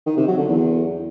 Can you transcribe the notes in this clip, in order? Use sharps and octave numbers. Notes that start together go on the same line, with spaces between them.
D#3
C3
F#3
D3
E2